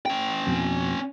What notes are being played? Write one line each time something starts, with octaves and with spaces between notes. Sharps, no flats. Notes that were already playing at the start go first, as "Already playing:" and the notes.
C#4 G5
F2 B2